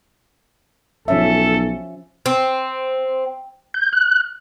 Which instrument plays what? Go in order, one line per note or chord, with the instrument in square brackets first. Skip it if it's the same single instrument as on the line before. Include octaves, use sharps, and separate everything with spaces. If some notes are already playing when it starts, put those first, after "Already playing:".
[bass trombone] B1 [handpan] F3 C#4 E5 [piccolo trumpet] A4
[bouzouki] C4
[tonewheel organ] G6
F#6